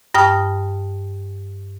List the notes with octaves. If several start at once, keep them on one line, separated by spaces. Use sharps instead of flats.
G2 G5 A5 D#6 F6